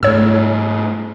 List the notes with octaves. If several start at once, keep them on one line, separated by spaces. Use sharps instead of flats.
G#2 A3 C#5 E6